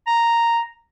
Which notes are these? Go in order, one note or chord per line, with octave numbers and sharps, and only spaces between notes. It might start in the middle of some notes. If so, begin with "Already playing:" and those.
A#5